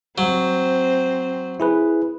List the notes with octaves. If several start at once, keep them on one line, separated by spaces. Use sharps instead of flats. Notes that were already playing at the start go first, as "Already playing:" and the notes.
F#3 C4 C5
E4 G#4 B4